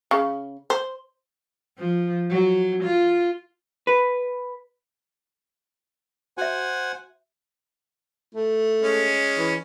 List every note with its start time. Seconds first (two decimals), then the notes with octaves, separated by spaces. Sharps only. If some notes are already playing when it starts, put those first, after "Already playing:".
0.11 C#3
0.70 C5
1.78 F3
2.30 F#3
2.84 F4
3.87 B4
6.38 F#4 C5 E5 F#5 G#5
8.35 A3
8.82 G#3 C#4
9.38 E3